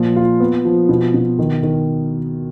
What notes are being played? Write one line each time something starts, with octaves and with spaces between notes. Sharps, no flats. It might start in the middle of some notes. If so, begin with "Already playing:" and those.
Already playing: A#2 F3
F4
B3
F3
B2
B2
D#3
D#3